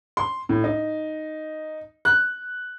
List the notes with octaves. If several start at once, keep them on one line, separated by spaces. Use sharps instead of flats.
C6
A2
D#4
F#6